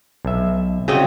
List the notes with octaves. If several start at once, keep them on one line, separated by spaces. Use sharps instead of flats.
B1 E5
C#3 F#3 G3 C4 F#4 D#5